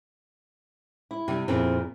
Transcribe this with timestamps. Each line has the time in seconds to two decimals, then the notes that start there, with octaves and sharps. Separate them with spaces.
1.11 E4
1.28 C3 G3
1.48 F2 A#2 B3 C4 E4 G#4